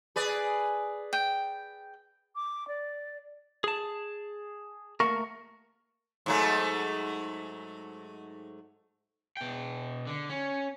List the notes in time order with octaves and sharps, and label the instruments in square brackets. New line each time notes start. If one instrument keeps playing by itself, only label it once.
[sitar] G#4 B4 D5
[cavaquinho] G5
[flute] D6
D5
[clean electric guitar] G#4 A5
[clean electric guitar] A3 A#3 A#4 [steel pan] C#6
[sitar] G#2 F#3 A3
[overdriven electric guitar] B2 G5
D3
C#4